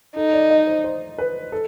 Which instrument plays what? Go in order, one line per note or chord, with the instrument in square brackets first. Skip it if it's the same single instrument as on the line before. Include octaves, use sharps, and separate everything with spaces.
[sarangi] D#4 [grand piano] A4
[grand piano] D5
D#5
C5
C5
B4
A4